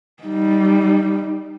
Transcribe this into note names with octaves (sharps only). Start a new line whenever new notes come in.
G3 D#4